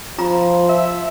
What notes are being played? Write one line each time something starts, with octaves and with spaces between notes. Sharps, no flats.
F3 F4 A#5
E5